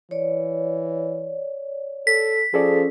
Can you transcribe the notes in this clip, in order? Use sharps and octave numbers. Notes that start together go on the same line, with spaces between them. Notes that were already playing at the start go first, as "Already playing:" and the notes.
E3 C#5 D5
A4 B6
F3 C#4 G#4 A4 D5